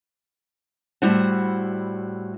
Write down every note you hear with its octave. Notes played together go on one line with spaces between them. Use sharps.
A2 G3 E4 F#4 C5 F#5